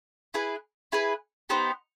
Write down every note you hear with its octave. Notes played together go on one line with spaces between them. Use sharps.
E4 G#4 B4
E4 G#4 B4
B3 D#4 G4 C5